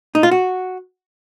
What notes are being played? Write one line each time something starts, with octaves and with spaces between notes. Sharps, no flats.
D#4
F4
F#4